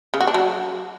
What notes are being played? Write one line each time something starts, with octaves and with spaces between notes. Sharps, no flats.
C#3
F#4
D4
F#3